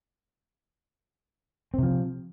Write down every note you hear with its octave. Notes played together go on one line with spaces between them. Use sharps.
C3 F3 C4